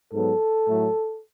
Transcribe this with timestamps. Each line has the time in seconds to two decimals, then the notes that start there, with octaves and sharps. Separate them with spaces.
0.13 G#2 F#3 B3 A4
0.68 A2 F#3 A3